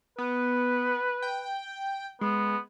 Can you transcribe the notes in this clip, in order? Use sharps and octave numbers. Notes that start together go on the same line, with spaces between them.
B3 B4
G5
G#3 B3